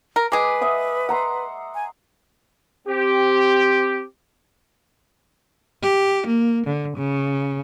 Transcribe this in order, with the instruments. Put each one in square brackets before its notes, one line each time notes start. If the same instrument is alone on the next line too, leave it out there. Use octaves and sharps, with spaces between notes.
[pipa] A#4
[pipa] G#3 G#4 [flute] B4 [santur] D6
[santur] D#5 E5 F#5
F#5 A#5 C6
[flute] G#5
[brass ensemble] C4 G4
[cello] G4
A#3
D3
C#3